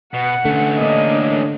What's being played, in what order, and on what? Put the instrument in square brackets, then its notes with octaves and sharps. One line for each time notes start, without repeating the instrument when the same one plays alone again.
[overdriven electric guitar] B2 [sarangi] F#5
[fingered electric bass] D3 [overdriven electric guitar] A3 C#4
[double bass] A#3 D4 [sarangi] D#5